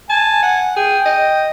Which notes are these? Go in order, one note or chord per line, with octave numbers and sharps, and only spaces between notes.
G#5 A5
F#5
G#4 G5
D#5